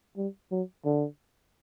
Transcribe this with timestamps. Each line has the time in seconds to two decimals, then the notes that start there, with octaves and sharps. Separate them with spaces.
0.17 G3
0.52 F#3
0.85 D3